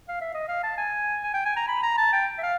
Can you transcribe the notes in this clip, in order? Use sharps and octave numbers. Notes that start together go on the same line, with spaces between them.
F5
E5
D#5
F5
A5
G#5
G#5
G5
G#5
A#5
B5
A#5
A5
G5
E5
F5